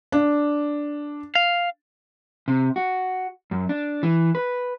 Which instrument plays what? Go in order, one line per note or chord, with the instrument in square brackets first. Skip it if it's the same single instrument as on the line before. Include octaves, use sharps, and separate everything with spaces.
[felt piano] D4
[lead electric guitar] F5
[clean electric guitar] C3
F#4
F#2
D4
E3
B4